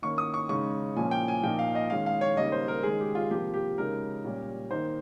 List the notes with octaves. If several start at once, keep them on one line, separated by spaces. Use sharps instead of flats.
D#3 A#3 C#4 C#6
D#6
C#6
C#3 G#3 D#4 C#6
A#2 F3 A#3 C#4 G#5
G5
G#5
A#2 F3 A#3 D#4 G5
F5
D#5
D#3 G#3 C#4 F5
F5
C#5
C#3 G3 A#3 D#4 D#5
C5
A#4
D#3 G#3 C#4 G#4
G4
F4
C3 F3 A#3 G4
G4
C#3 G#3 D#4 A#4
A#2 G3 C#4
D#3 A#3 D#4 C5